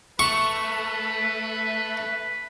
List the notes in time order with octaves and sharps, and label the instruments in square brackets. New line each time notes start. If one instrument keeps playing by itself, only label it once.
[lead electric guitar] A3 [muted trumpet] B4 [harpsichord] C#6